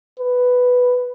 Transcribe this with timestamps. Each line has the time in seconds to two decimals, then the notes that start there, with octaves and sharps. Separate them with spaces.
0.19 B4